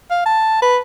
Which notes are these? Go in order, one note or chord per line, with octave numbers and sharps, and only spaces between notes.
F5
A5
B4